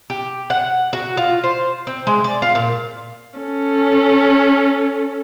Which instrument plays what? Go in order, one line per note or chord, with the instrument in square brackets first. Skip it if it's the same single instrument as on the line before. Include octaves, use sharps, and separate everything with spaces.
[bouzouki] G4
F#5
F#4
F4
C5
C4
G#3
D5
F4
A#2
[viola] C#4 A4